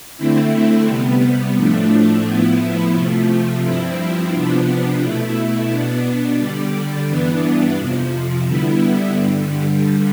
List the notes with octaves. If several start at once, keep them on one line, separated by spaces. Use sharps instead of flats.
D3 A3 C4 E4
C3 G3 B3
A2 F3 A3 D4
A2 F3 B3 E4
C3 F3 A3
G2 F3 C4 E4
C3 F3 B3 D4
B2 A3 E4
B2 B3 D4
D3 G3 D4
G2 E3 B3 D4
F2 C3 F3
D3 G3 B3 E4
G2 D3 G3